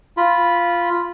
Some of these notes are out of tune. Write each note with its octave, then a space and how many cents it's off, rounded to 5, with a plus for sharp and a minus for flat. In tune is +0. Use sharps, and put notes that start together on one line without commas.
F4 -5 B5 -5